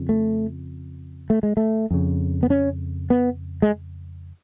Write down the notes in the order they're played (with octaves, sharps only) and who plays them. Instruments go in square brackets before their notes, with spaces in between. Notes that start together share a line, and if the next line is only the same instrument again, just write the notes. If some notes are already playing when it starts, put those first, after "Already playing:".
Already playing: [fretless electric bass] F2 C#3
A3
A3
G#3
A3
F2 C#3
B3
C#4
B3
G#3